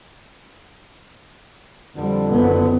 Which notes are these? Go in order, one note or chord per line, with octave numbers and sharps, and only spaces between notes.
F2 D3 G3
F#1 B3